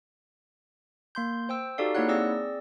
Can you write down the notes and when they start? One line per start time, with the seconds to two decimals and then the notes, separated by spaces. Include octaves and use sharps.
1.15 A#3 C6 G6
1.49 C5 G5 E6
1.78 D#4 F#4 G4 A4 D5 F5
1.95 A#3 D#4 E4 C#5 F#5 F#6
2.08 C4 G#4 D5 E6 A#6